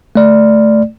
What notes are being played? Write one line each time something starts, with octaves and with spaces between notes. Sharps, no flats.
A3 D5